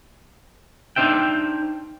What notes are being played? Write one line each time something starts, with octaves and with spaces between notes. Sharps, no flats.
D4 D#4 C5 E5 G5